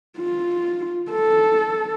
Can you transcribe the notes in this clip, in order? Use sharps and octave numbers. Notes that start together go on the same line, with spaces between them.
F4
A4